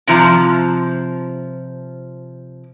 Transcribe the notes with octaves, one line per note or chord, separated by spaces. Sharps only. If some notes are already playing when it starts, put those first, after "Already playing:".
C3 F3 A#5